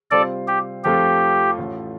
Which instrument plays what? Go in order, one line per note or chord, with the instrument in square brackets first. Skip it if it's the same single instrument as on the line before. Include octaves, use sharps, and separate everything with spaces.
[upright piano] C3 G3 F4 C5 [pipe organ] A4 D5
[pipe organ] G4
[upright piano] F2 F3 A3 F4 [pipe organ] G4
[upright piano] A1 A2 A3 F4